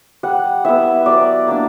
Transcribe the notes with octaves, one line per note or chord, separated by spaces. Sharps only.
G3 F#5
B3 E4 E5
F#3 D5
A#3 D4